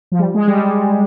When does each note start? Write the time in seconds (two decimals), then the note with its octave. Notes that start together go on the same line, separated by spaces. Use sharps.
0.12 F3
0.19 G3
0.34 G#3
0.48 G3